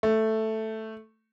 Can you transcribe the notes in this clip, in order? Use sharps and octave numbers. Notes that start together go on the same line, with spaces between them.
A3